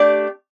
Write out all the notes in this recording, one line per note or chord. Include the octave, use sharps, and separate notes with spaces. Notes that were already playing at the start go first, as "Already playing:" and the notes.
Already playing: A3 D4 G4 D5